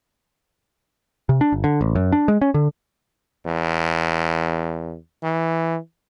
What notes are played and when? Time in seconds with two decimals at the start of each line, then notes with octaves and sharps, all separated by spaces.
1.29 C3
1.41 D4
1.52 G1
1.64 D3
1.81 A1
1.95 F#2
2.12 D4
2.28 G#3
2.41 C#4
2.54 D3
3.46 E2
5.23 E3